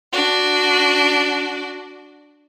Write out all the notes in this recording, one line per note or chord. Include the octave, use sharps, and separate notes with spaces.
D4 F#4